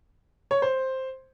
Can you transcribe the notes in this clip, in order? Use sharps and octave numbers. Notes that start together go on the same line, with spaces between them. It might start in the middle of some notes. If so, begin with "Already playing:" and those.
C#5
C5